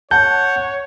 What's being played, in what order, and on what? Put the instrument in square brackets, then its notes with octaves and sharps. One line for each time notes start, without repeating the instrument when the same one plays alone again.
[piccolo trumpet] C#5 [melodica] F#5 [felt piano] A5 [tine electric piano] G6